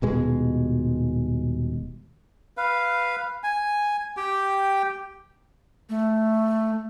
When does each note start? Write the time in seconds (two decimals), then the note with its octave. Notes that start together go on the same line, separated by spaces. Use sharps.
0.02 D#1 B2 G#3
2.57 B4 F5
3.43 G#5
4.17 G4 G5
5.89 A3